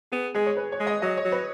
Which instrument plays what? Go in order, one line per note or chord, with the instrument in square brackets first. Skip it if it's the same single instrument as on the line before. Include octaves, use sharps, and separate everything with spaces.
[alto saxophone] B3 [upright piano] G#4
[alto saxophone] G#3 [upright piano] G#4
[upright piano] C#5
B4
C#5
[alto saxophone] G#3
[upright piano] D#5
[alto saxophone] F#3 [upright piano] D#5
[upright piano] C#5
[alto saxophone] F#3
[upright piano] B4